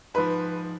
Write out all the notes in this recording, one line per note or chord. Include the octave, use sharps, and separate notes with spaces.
G#2 F3 B4